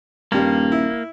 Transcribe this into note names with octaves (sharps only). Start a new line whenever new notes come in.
D#1 G2 G3 A#3
E4